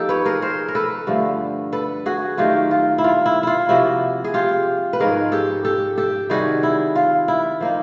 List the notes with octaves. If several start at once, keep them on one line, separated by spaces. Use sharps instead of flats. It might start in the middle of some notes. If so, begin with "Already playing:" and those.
Already playing: F3 A#3 D#4 G4 A4
B4 C#5
G#4 A#4
A#4 C5
A#4
A4 B4
G2 D3 F3 A3
A4 B4
F#4 G#4
D#3 F#3 A3 F4 G4
F4
E4
F4
E4
E4 F4
C3 F3 A#3 E4 F#4
G#4
F4 G4
B4
G#2 F3 G#3 C#4 G#4 A#4
G4 A4
G4 A4
G4 A4
C3 D#3 G3 F#4 G#4
E4
F4
E4
F3 A#3 D#4